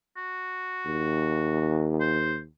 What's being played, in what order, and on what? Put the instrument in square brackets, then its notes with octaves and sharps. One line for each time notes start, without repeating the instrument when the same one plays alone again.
[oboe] F#4
[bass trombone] D#2
[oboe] C5